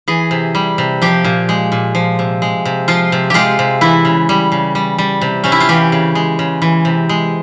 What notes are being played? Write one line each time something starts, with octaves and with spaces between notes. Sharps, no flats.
E3 G#4
C3
G3
C3
F3 G4
A#2
G#3
A#2
F3
C3
G#3
C3
F3 F4
C3
G#3 F4 G4
C3
E3 E4
C#3
G3
C#3
G3
G3
C3
C3 C#4
E4
F4
E3 G4
C#3
G#3
C#3
E3
C3
G#3